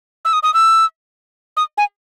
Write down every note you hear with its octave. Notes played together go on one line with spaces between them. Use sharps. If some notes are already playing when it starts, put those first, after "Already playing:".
E6
D#6
D#6
E6
D#6
G#5